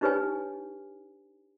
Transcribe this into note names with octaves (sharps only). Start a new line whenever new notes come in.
D4 D#4 G4 B4 C#5 G#5